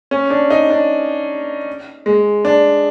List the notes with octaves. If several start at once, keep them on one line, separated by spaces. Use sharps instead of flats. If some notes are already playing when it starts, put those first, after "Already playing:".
C#4
D4
D#4
D4
G#3
D4